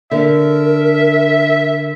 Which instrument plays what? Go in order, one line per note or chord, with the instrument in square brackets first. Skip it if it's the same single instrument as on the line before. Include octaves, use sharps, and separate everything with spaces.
[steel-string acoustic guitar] D3 [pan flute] A#4 [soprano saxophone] E5